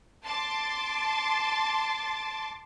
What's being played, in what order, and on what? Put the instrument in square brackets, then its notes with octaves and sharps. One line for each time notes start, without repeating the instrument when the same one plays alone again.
[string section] A5 C6 D6 A6